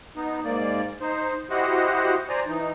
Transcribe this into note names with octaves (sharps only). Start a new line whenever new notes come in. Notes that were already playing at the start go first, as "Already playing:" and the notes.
B3 D#4
G#2 A#3 D5
D#4 C5
E4 F#4 G4 C5 D#5 F#5
C5 D5 G#5 A#5
E3 D#4